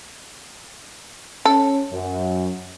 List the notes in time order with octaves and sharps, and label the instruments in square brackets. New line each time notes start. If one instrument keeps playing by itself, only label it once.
[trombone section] C#4 [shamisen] A4
[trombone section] F#2